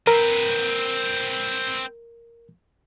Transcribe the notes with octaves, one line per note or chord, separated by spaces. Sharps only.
C4 A#4 B4